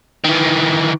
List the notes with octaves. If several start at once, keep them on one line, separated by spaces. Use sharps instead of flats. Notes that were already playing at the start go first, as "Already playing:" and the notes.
D#3 E3